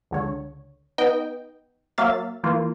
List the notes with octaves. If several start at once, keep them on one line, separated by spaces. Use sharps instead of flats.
C#2 D3 C#5
B3 D#4 D#5 G5
F#3 A#3 E5 F5 A6
E3 A#3 F4